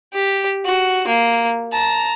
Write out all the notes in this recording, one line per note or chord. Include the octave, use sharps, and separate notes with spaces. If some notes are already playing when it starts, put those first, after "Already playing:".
G4
F#4
A#3
A5 A#5